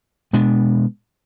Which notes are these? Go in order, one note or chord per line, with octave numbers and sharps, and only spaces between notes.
B2 G#3 B3 D4